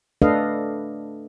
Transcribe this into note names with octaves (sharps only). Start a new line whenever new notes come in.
A3 D4 A4 B4 D#5 F5